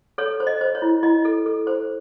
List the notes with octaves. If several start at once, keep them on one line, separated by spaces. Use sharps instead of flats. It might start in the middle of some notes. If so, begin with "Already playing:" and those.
A4 C#5
C5
D#5
C5
C#5
E4
E4 D#5
A4
A4
C5